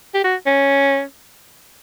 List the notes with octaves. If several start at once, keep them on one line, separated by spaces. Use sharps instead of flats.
G4
F#4
C#4